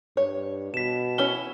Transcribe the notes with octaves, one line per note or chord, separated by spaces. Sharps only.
G2 C#5
B2 B6 E7
C#4 E4 C#5 G7